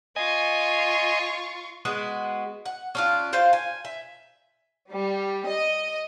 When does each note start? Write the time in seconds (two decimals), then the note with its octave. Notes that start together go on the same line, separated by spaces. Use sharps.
0.16 F4 D#5 G#5 C#6
1.85 G#3 B3 F#4
2.66 F#5
2.95 C#4 D4 F4
3.33 F4 C5 F5 G5
3.53 G#5
3.85 E5
4.91 G3
5.47 D#5